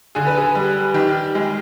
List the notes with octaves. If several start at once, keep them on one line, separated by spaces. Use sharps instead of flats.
D3 G#4
B4
G#4
G3
D#3 G4
G#3